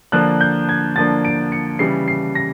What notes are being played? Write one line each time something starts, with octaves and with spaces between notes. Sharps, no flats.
D3 F3 A#3 D4 F#6
G6
G#6
D3 F3 A#3 D4 A6
D7
C#7
C#3 E3 G3 C7
C7
A#6